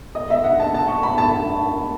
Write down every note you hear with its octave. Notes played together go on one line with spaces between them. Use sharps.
D#5
E5
F#5
A5
A5
C#6
B5
A5